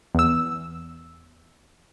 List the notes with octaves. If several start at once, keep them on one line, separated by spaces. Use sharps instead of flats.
E2 E6